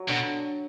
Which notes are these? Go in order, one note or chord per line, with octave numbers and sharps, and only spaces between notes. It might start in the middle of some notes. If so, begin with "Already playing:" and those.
Already playing: F#3
B2 D3